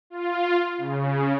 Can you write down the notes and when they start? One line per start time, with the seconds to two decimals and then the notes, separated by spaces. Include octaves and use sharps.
0.10 F4
0.78 C#3